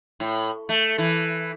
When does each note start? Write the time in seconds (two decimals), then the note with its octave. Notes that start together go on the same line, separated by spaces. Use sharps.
0.20 A2
0.69 A3
0.98 E3